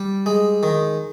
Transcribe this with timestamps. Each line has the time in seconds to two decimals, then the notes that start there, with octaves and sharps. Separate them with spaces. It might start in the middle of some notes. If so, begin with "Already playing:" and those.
Already playing: G3
0.26 G#3
0.63 D#3